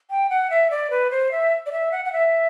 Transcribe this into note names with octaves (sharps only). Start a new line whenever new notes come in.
G5
F#5
E5
D5
B4
C5
E5
D5
E5
F#5
F#5
E5